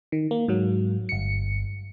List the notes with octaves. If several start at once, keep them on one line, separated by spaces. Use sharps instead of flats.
D#3
A#3
G#2 F#3
G1 C#7